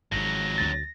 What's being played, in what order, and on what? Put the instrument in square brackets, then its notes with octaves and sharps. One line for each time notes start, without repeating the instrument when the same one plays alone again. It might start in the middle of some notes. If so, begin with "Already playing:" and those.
[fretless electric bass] G#1 G#2 [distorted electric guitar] F2 F#3 [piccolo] A#6
[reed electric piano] D2 A6